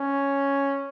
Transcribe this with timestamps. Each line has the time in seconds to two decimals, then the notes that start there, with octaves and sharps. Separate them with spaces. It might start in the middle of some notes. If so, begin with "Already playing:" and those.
Already playing: C#4